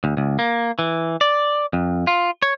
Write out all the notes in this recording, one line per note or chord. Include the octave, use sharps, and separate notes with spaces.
D2
C#2
A#3
E3
D5
F2
F4
C#5